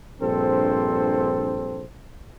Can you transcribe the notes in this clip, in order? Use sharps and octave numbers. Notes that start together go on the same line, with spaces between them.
A#1 G2 C4 A4 C5